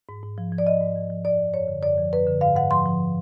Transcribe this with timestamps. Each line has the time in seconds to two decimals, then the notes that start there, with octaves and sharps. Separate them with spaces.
0.09 G#2
0.23 G#2
0.38 F3
0.52 F3
0.58 D5
0.66 G#2 D#5
0.81 G#2
0.96 F3
1.10 F3
1.25 F#2 D5
1.39 F3
1.54 F#2 C#5
1.68 D3
1.83 F#2 D5
1.98 F3
2.13 F#2 B4
2.27 D3
2.41 G#2 F5
2.56 G#2 F#5
2.71 F3 C6
2.86 F3